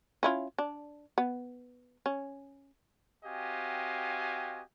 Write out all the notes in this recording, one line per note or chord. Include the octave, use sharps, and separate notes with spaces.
C#4 E4 F4
D4
B3
C#4
C4 F#4 G4 D#5 F5 G#5